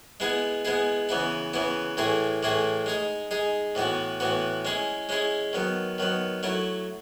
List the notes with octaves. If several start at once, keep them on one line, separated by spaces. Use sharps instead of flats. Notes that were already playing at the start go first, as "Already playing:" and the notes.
G#3 B3 E4 G#4
G#3 B3 E4 G#4
C#3 E3 B3 E4
C#3 E3 B3 E4
A2 E3 A3 E4 G#4
A2 E3 A3 E4 G#4
G#3 D#4 G#4
G#3 D#4 G#4
A2 E3 B3 F#4
A2 E3 B3 F#4
G#3 C#4 E4 G#4
G#3 C#4 E4 G#4
D#3 F#3 B3
D#3 F#3 B3
F#3 A3 E4